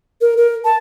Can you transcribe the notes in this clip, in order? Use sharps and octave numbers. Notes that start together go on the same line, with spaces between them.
A#4
A#4
A5